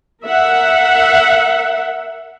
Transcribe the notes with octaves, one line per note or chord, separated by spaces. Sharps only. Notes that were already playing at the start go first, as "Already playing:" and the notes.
A#4 E5 F#5